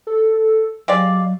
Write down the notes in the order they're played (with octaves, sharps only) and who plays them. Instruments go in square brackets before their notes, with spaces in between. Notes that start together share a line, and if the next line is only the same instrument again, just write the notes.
[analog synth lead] A4
[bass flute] F#3 [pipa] G#3 G4 D5 [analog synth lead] F5